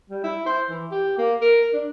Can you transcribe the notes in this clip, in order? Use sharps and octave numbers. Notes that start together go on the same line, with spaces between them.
G3
E4
C5
E3
G4
A#3
A#4
D4